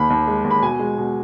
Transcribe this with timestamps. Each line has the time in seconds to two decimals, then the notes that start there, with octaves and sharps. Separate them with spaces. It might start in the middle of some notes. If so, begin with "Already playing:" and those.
Already playing: D#2 B5
0.10 D#2
0.27 G#3
0.44 D#2
0.51 B5
0.62 B2 G#5
0.79 G#3
0.98 B2